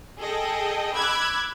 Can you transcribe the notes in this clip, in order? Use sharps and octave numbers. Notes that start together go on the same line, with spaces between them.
G#4 A4 D#5 G5
B5 D6 E6 F#6 G#6